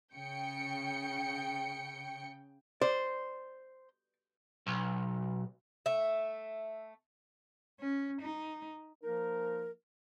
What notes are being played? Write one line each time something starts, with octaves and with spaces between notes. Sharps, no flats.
C#3 G5 C#7
C5 D5
B1
A3 E5
C#4
D#4
F3 A#3 D#4 A#4